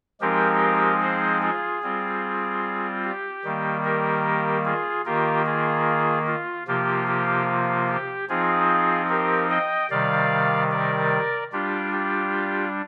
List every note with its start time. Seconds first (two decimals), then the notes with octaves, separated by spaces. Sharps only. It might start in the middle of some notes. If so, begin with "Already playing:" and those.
0.21 F3 G#3 C4 D#4 G4 A#4
1.02 G#4 C5
1.42 F4 G#4
1.83 G3 C4 F4
3.04 G4
3.44 D#3 G3 A#3
3.84 G4 A#4
4.65 F4 G#4
5.05 D#3 A#3 F4 G4 A#4
5.46 F4 G#4
6.27 F4
6.68 C3 F3 A#3 F4 G4
7.07 G4
7.89 G4
8.29 F3 C4 D#4 F4 G#4
9.09 G4 A#4
9.50 D#5 G5
9.90 C3 D#3 G3 D5 F5
10.71 A#4 D5
11.52 G3 D4 F4 G4
11.92 G4